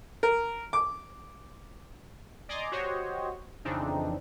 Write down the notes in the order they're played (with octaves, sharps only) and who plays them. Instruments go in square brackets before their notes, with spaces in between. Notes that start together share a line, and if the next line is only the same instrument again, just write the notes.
[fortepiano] A#4
D6
[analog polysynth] D5 D#5 G#5 A#5 C6 D6
F#4 G4 C5 C#5 D#5
F2 C#3 E3 C4 D4 D#4